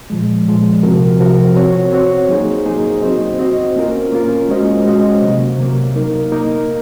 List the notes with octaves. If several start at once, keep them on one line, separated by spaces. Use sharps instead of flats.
A#2 F3 G#3
A#2 F3 G#3
C3 F3 C4 F#4 A#4
C3 F3 C4 F#4 A#4
C4 F#4 C#5
C4 F#4 C#5
F#3 A#3 D#4 G#4 C5
F#3 A#3 D#4 G#4 C5
C4 F#4 C5 D#5
C4 F#4 C5 D#5
A#3 C#4 F4 A#4
A#3 C#4 F4 A#4
G#3 C#4 F#4 C5 D#5
G#3 C#4 F#4 C5 D#5
C3 F#3 A#3
C3 F#3 A#3
A#3 D#4 A#4
A#3 D#4 A#4